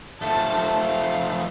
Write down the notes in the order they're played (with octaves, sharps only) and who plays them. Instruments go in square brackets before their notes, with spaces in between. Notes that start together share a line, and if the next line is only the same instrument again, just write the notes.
[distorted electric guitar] F3 A3 [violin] A5
[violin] F5